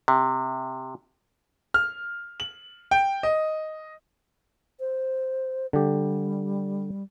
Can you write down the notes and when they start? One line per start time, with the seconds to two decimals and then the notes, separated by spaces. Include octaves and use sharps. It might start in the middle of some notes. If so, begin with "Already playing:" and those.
0.08 C3
1.74 F6
2.40 F#7
2.91 G5
3.23 D#5
4.80 C5
5.73 D3 G3 G4